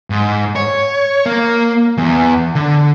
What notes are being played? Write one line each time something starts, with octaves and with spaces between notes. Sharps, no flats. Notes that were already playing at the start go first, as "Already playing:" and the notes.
G#2
C#5
A#3
E2
D3